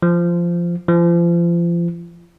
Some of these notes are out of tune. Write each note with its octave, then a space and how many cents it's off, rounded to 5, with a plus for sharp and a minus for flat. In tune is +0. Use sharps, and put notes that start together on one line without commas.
F3 -15
F3 -35